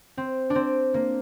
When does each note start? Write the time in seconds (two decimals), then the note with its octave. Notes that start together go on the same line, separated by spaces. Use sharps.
0.17 C4
0.50 D4
0.55 C4
0.94 A#3